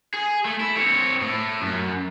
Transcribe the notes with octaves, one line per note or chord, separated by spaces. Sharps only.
G#4
A3
E4
C4 C#5
A2
F#2